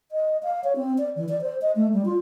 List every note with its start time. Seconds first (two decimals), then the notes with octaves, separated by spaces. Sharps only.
0.12 D#5
0.43 F5
0.64 C#5
0.76 C4
0.98 D5
1.16 E3
1.29 D5
1.41 C5
1.62 D#5
1.76 A3
1.93 G3
2.05 F4